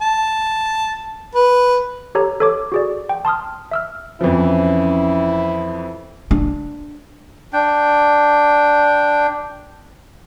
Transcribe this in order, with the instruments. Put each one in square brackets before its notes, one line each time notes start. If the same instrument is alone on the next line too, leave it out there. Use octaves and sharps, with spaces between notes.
[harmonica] A5
B4
[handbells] G4 A4 C#5 A#5
A4 C#5 D6
F#4 G#4 D5
G5
A5 C6 D#6 F6
E5 E6 F6
[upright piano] F2 E3 F3 [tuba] C#4 [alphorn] E4
[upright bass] D4
[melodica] D4 G5